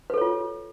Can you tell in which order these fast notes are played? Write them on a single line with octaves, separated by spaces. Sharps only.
B4 A4 C#5 F4